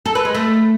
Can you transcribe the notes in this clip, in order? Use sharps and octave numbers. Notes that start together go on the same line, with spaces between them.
A4
B4
G#3
A3